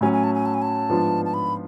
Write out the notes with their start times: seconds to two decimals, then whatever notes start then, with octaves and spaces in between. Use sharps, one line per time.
0.01 A2 F#3 C#4 G#5
0.12 G#5
0.24 A5
0.34 G#5
0.46 A5
0.54 G#5
0.62 A5
0.89 G#2 F3 B3 D4 F4
1.25 A5
1.34 B5